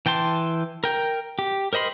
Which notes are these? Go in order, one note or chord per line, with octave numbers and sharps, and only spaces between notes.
E3 G5 A5 C6
A#4 G5
G4
A#4 C5 D#5 B5 C6